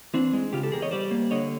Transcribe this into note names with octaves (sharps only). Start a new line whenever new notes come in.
E3 C4 D4
G#3
C#3 F4 G4
G4 A4
E2 G#4 A#4
C#5 D#5
G3 C5 D5
A#3
D3 C#5 D#5